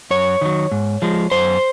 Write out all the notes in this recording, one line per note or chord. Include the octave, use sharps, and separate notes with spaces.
F#2 C#5
D#3 F#3
G#2
F3 G#3
F#2 C5